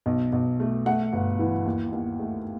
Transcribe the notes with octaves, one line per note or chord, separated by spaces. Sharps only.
B1
B1
A3
A3 F#5
G1
E3
D#2
D#2
A3